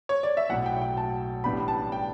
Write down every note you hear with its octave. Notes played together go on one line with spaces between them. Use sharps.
C#5
D5
E5
B1 A2 F#3 F#5
G5
G5
A5
A1 A2 G3 B3 D4 B5
A5
G5